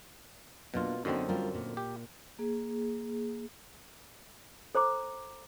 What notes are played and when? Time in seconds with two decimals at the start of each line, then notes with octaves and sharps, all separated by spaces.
0.74 B2 F#3 A#3 D4 F4
1.05 F#2 D3 B3 C4 D#4
1.28 G3 F4 A#4
1.54 A#2
1.77 G4
2.39 A#3 G#4
4.75 A4 C5 A#5 D6